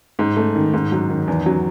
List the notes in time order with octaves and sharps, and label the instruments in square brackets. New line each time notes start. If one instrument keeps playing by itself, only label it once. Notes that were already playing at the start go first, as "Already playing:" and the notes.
[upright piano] G#2
A3
D#3
G#2
F#3
D#3
E2
F#3